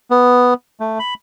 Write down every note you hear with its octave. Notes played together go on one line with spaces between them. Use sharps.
B3
A3
B5